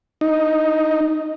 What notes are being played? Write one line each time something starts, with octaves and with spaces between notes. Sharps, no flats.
D#4